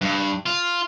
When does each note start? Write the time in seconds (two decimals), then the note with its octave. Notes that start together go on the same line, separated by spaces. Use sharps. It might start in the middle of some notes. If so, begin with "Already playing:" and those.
0.01 G2
0.46 F4